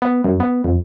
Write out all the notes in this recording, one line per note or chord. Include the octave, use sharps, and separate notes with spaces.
B3
F#2
B3
F2